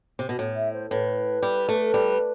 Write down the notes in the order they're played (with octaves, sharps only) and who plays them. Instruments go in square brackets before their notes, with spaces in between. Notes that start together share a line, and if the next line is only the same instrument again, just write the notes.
[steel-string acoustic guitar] C3
B2
A2
[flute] E5
C5
[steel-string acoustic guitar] A2 [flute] B4
[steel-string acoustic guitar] G3
A3
G3